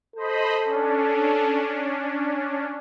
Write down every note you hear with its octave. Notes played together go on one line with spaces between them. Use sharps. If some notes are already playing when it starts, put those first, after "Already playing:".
A4 C5 D#5 B5
C#4 D4